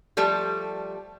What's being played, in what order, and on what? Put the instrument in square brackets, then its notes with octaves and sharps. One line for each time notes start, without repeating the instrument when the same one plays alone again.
[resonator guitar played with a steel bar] F3 G3 A3 A4